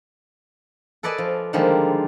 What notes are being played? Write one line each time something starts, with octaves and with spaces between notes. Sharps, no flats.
A4 B4 D5 D#5 G#5 A5
F3
D3 D#3 F3 G3 G#3 A#3